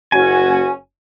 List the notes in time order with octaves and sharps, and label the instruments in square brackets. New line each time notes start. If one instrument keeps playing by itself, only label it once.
[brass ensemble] F#1 C#4 F#4 [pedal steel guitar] G#5